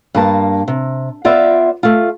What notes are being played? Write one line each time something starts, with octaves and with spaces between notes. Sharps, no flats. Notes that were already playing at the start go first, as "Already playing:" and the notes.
G2 A#3 A5
C3
B3 F4 D5 E5
A3 F4